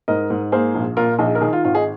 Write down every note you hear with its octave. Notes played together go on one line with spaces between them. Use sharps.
G#2 A#4 D#5
G#2
A#3 G#4 C5
A#1
A#2 F4 A#4
A#1 D#4 G#4
A#4
D#3 D#4 G#4
F4
G#1 F4
D#4 G#4